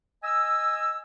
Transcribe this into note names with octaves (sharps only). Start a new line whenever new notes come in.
D#5 G#5 E6